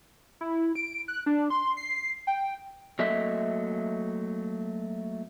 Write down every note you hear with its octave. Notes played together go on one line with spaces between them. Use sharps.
E4
D7
F#6
D4
C6
C7
G5
F#3 A3 A#3 D#5 E5